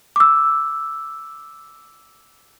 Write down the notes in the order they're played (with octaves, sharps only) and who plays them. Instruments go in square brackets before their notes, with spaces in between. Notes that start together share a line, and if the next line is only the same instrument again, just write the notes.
[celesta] D6 E6